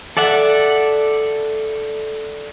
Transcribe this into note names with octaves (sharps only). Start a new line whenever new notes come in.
A4 D5 E5 F#5